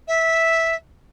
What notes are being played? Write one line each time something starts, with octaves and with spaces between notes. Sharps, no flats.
E5